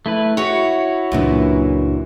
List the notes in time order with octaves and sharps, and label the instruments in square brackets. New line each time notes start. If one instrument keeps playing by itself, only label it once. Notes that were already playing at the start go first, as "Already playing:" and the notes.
[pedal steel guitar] A3 E4 B4
[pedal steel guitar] E4 [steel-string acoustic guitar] F#4 C#5
[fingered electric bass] C#2 D4 [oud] F#2 A#2 E3